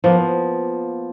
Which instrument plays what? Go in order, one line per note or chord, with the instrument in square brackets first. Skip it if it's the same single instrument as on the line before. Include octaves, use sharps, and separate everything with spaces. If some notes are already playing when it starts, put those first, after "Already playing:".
[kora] F3 A#3 B3